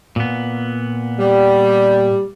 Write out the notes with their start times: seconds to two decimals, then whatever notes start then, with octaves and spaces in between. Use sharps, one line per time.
0.16 A#2 B3
1.19 G3